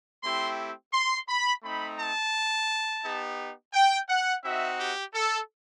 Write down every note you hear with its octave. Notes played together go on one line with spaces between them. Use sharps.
A3 C4 E4 G4 C6
C6
B5
A3 C4 D#4 B5
A5
B3 D#4 G4
G5
F#5
C4 D#4 F#4 E5
G4
A4